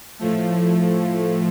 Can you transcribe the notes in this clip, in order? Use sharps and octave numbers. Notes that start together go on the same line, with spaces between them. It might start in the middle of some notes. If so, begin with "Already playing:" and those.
A2 F3 A3